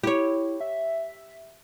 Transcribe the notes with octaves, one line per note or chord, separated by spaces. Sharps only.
E4 G4 C#5
E5